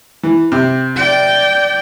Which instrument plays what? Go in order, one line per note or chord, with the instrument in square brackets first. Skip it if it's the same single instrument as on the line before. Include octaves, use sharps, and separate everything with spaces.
[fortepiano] E3
C3
[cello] D5 G5